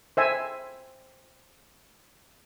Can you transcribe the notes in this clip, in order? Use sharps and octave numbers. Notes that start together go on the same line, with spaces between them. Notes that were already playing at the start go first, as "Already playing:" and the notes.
C5 E5 G#5